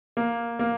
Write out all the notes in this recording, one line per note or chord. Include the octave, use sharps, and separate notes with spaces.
A#3
A#3